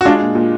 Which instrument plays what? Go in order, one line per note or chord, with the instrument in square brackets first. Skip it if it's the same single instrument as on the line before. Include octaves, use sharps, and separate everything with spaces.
[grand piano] F#4
[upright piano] G#3 [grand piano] D4 F4
[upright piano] A#2
A#2